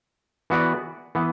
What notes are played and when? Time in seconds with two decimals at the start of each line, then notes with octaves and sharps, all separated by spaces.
0.50 E3 B3 F#4 B4 D5
1.15 E3 B3